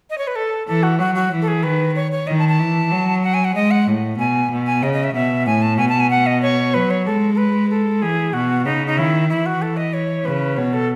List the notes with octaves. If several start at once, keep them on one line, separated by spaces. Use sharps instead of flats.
D#5
C#5
B4
A4
E3 A4
F#4
F#3 F#4
F#4
E3
A4
G#4
D#3 B4
C#5
C#5
D#3 D#5
A5
A5
E3
F#3
F#5
G#5
F#5
G#3 D#5
F#5
A2
B2 G#5
B2
G#5
C#3 D#5
D#5
E5
B2 E5
A2 G#5
A5
B2 G#5
A5
G#5
F#5
D#5
C#5
F#3 B4
C#5
G#3 A4
A4
B4
A4
E3 G#4
B2 F#4
C#3 D#4
D#4
D#3 E4
E3 E4
F#4
A4
D#5
C#5
C#3 B4
B2 C#5
A4